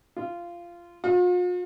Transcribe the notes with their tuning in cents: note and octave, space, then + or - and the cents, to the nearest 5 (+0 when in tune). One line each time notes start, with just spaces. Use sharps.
F4 -15
F4 +45